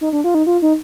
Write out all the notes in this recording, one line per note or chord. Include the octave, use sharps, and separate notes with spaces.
D#4
D4
F4
D#4
F4
D#4